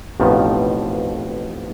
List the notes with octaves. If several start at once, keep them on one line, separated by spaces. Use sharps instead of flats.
A1 F2 B2 D#3 F3